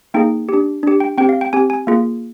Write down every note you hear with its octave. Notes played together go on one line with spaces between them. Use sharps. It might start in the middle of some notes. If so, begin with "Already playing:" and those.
A#3 D#4 G#4 G5
D4 G4
D4 G4
G5
C4 G4 G5
F5
G5
C4 G4 G#5
G#5
A#3 F4 G#4